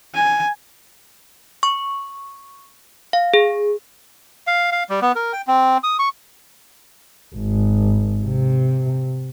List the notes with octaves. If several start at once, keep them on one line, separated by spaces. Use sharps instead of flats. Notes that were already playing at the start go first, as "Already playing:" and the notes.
G#5
C#6
F5
G#4
F5
F5
G3
B3
A#4
G5
C4
D#6
C#6
G#1
C3